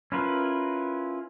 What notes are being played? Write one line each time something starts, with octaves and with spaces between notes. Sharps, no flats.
C#4 E4 F4 A#4 B4